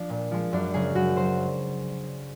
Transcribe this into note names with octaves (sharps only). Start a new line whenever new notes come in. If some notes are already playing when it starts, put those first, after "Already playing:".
Already playing: F3 D4
A#2
F3 G#3
F#2 D4
C#3 F#3 G#4
F#2 F#4
C#3 F#3 C5